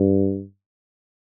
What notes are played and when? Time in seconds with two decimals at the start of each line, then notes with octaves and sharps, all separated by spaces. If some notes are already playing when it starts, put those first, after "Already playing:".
Already playing: G2